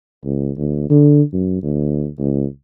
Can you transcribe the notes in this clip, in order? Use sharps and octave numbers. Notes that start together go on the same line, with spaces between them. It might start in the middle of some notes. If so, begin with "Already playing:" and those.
C#2
D2
D3
F#2
D2
C#2